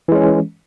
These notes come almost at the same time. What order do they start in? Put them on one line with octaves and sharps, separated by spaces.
E3 G#3 C#4